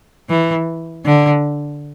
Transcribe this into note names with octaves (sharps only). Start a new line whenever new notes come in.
E3
D3